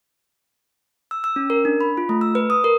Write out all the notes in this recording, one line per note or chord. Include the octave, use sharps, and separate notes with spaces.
E6
E6
C#4
A#4
D4
B5
F4
A3
E6
B4
D#6
A#4